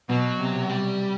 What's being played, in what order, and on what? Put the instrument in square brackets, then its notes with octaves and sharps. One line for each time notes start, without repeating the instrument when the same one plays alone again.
[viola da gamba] B2 [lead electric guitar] F#3
[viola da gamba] C3
[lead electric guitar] G3